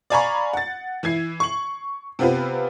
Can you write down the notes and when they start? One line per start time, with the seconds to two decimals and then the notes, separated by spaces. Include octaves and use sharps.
0.10 D5 F5 G#5 A#5 B5 C#6
0.53 F#5 A6
1.03 E3 E4 G#6 C7
1.40 C#6 F#7
2.19 C3 B3 C4 F4 B4